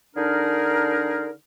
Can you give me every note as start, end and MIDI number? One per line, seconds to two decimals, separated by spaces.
0.16 1.30 50
0.16 1.30 62
0.16 1.30 63
0.16 1.30 68
0.16 1.30 70